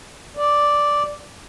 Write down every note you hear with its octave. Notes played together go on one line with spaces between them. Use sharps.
D5